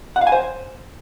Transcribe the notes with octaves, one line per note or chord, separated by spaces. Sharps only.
F#5
F5
G#5
C5